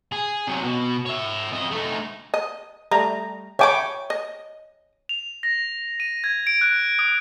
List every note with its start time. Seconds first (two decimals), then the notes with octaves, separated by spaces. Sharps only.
0.12 G#4
0.48 C3 F#3
0.63 B2
1.06 C#5 E5
1.53 F2 D#5
1.71 A3 D#4
2.34 D#5
2.92 G3 A3 A#5
3.59 C#5 E5 G5 G#5 B5 D6
4.10 D#5
5.09 F7
5.43 A#6
6.00 D#7
6.24 G#6
6.47 D7
6.61 F#6
6.99 D#6